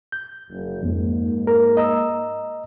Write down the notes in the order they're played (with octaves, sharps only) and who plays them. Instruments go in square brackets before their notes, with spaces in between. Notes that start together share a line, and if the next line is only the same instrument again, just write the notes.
[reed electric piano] G6
[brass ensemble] F#1
[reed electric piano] F2 [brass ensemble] G#2 A#3
[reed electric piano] A#4
D#5 A#5 E6